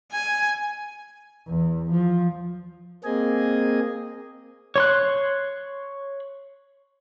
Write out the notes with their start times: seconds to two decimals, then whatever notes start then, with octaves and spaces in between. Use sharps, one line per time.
0.12 G#5
1.48 E2
1.91 F3
3.04 A#3 C4 G#4 D#5 G#5
4.76 C#5 C6 F#6